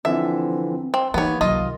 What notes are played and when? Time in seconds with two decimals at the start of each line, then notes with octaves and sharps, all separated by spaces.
0.05 D3 E3 F3 C4 E5
0.94 C4
1.14 E3 A#3 B3 D#4 G4 C#5
1.41 C2 D#3 F#3 F4 D#5